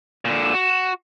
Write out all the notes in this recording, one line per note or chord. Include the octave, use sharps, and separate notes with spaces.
A#2 D3 E7
F#4